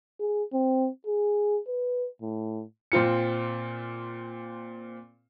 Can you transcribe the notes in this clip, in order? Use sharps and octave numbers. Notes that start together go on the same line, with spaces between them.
G#4
C4
G#4
B4
A2
A#2 C4 F4 C#7